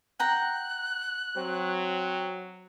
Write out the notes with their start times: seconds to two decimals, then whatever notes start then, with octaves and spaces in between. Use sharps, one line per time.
0.20 F#5 G5 A#5 F#6
1.36 F#3 C4